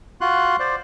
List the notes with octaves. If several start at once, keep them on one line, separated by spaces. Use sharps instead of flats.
F4 F#4 C6 F#6
C5 D5